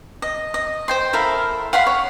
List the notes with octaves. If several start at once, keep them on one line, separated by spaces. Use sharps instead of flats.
D#5
D#5
C5 G5 C6
E4 A4 A#4 F5
F5 F#5 B5 C6
C#5